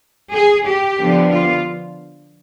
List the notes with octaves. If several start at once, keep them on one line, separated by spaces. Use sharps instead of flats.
G#4
G4
D3 F3 B3 D4
F4